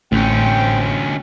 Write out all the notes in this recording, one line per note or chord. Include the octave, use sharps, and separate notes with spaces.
A1 D2 C4 C#4 G5